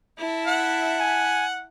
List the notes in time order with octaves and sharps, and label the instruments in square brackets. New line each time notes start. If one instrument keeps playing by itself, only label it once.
[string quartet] E4 E5 A5
[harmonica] F#5
[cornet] G#5